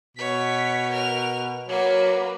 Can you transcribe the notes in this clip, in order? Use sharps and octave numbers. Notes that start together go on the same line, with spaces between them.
B2 C#5 B6
A#4 F7
F#3 A#3 B4